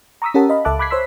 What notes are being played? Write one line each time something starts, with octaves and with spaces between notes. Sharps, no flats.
A#5 C#6 D#6 E6 B6
C#4 G4 A#4 F#5 A5
D#5 F5 B5
C#2 A4 E5 A5 D6 F#6
B5 D6 F#6 G#6 B6 C7
C5 C#5 C6 E6 B6